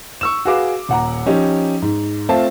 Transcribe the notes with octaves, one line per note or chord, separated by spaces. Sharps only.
C#6 E6 E7
F#4 G#4 B4 F5 D6
D#1 F#5 A#5
F3 C#4 D#4 G4
G#2
A3 C4 F4 A5